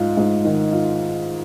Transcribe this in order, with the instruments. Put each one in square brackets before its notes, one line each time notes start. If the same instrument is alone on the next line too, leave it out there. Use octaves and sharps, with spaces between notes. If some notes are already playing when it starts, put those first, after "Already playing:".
Already playing: [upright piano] G#2 F4
G#2
D#3
F4